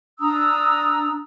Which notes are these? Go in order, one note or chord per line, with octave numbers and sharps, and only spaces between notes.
D4 A#5 D#6 E6